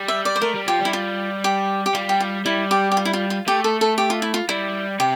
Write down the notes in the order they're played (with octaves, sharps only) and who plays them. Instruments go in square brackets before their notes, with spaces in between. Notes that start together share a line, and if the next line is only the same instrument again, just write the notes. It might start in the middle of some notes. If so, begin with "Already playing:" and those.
Already playing: [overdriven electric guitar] G3
[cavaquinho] E5
D5
C5
[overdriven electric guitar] A3 [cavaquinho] A#4
[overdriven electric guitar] G3
[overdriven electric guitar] F3 [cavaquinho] G4
[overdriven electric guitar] G3
[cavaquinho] E4
F4
G4
G4
[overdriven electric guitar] G3 [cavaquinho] F4
[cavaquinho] G4
F4
[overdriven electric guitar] G3 [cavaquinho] E4
[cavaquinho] G4
G4
F4
E4
F4
F4
[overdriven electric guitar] A3 [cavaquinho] G4
[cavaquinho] A4
A4
G4
F4
E4
F4
[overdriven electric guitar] G3 [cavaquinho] E4
[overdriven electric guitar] C3 [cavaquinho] G4